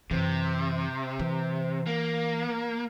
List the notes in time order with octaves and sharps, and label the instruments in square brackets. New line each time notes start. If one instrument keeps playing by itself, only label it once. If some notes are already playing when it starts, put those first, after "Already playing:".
[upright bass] F#2 E3 [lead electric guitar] C3
[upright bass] E3
[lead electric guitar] A#3